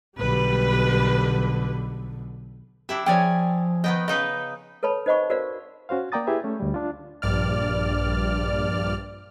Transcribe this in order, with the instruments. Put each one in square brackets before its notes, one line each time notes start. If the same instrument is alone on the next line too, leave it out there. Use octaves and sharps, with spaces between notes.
[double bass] B1 D3 [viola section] G3 B4
[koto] D4 E4 E5 [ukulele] G4
[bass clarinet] F3 [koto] C#4 G#4 G#5 [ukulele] C#5 D5 G5
[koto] D#3 B3 G5 [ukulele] D#5
[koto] C#3 D#4 B4 [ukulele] D#5
[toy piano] A4 B4 C#5 A5 B5
D#4 C5 D#5 F#5 B5 C#6
F#4 A#4 C5 D5 F5
[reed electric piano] C#4 F#4 C5 F5
A#3 D5 G5 A#5 D#6 A6
E4 G4 G#4 B4 E5
A3 C#4
D2 G3
D4 F4
[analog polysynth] A#1 G2 D5 F6